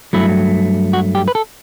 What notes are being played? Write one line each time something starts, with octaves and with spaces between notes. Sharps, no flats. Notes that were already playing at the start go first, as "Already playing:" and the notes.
G2 F#3 A3 E4
F#4
G4
B4
A4